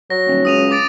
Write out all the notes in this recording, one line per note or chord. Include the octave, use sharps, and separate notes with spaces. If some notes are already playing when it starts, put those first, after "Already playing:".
F#3 A#6
D#1
C#2 D#6 D#7 F7
D6 A6 D7